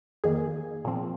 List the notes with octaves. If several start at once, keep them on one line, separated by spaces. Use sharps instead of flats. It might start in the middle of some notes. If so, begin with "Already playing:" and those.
F2 D#3 A#3 G#4
A#2 F3 C4